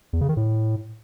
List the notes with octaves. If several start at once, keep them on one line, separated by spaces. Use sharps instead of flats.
E2
C#3
D#3
A2